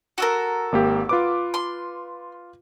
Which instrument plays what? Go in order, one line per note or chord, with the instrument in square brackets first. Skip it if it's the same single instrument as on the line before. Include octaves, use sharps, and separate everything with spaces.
[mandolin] F#4 A4 A#4
[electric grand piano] G#1 A#3 G4
F4 B4 D6
[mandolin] C6